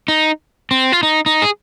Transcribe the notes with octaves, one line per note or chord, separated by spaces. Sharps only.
D#4
C4
F4
D#4
D#4
G#4